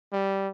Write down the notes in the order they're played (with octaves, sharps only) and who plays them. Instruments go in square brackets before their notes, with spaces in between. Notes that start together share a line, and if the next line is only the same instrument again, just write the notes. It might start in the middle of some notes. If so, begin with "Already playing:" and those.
[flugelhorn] G3